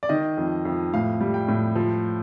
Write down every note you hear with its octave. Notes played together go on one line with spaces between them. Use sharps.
D5
D#3 D#5
F2
F2
A2 F5
G3
G5
A2
F3